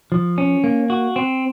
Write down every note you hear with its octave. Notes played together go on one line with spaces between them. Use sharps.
F3
C#4
A#3
F#4
C4